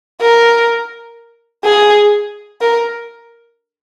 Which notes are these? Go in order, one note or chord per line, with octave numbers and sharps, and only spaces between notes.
A#4
G#4
A#4